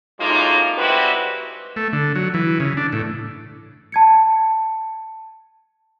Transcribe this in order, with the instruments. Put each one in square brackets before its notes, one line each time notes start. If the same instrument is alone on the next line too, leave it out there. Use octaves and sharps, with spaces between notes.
[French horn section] F#2 A2 G#3 A#3 D#4 F4
G3 G#3 C4 E4 F#4 B4
[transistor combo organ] A3
D3
F#3
E3
C#3
D4
A2
[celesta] A5 G#6 C#7